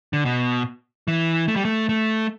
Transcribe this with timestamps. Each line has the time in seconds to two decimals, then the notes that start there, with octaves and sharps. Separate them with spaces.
0.13 D3
0.25 B2
1.08 E3
1.48 A3
1.56 G3
1.65 A3
1.89 A3